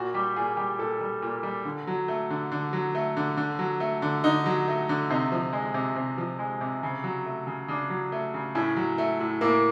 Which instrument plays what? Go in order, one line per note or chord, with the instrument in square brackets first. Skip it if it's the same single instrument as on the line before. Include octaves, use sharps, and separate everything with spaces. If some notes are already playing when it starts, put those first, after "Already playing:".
Already playing: [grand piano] A#2 F#4
G3 G4
A#2 G#4
G3 G4
A#2 A4
G3
A#2
G3
D3
F#3
A3
D3
D3
F#3
A3
D3
D3
F#3
A3
D3
D3 D#4
F#3
A3
D3
C3 D#4
F3
G#3
C3
C3
F3
G#3
C3
C#3
F#3
A3
C#3
C#3 D4
F#3
A3
C#3
A2 C#4
F#3
A3
A2
A2 A#3